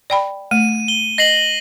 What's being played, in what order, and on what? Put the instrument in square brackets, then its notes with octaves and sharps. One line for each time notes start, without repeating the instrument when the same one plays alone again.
[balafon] D5 G5 B5
[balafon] A3 [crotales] D#7
[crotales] G7
[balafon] D#5 [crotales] A#6 C7 F#7